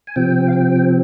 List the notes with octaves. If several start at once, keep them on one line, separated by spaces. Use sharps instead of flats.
G#5
C3 F3 C4 G5
F5
G5